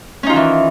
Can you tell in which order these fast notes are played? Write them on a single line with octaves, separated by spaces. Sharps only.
C#4 D#4 F4 D#3 E3